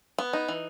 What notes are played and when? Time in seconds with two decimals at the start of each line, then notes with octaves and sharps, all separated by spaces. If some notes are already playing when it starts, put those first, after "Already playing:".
0.18 B3
0.33 D#4
0.49 E3